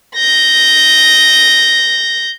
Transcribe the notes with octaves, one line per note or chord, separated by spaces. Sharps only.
G6 A#6